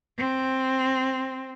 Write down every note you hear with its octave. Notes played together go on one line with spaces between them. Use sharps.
C4